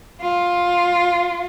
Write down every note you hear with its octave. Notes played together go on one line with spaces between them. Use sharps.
F4